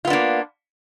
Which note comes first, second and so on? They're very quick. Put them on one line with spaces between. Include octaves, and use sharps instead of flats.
F4 B3 D4 A#3